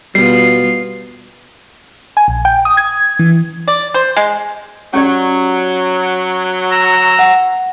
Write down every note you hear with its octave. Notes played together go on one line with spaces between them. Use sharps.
B2 G3 B3 F4 C7
G#5
A#1
G5
D#6
G#6
E3
D5
C5
G#3
F#3 C#4 G4 D5
A#5 E6
F#5